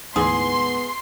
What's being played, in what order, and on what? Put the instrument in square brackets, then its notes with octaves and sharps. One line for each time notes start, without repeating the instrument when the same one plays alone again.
[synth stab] D2 G#2 E3 [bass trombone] B3 [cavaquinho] G#4 [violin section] C6